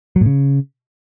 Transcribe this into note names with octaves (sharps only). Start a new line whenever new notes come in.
F#3
A2
C#3